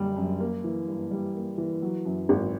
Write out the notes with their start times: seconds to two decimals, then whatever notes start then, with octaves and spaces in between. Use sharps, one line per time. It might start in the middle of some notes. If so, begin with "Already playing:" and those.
Already playing: F#1 F#2 D3 G3
0.16 F#2
0.40 A#3
0.64 E3
0.88 G2
1.11 G3
1.35 A#3
1.58 E3
1.82 F#3
2.05 F#2
2.29 G#1